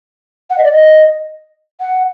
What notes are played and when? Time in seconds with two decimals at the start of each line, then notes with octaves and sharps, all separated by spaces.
0.50 F#5
0.58 D#5
0.64 D5
0.72 D#5
1.81 F#5